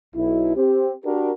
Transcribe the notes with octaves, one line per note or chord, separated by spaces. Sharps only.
B1 E4
C4 G4
D4 F#4 G4 A#4